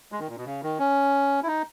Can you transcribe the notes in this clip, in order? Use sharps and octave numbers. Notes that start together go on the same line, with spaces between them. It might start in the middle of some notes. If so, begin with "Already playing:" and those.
G#3
D#3
A#2
B2
C#3
D#3
C#4
E4
D#4